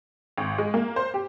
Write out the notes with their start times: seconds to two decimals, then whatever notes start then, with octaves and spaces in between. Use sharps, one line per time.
0.38 G#1
0.58 G#3
0.74 A#3
0.96 C5
1.14 G4